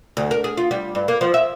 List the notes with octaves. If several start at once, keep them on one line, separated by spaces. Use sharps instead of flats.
D2
A#4
G#4
F4
G3
G2
A#3
F3
E5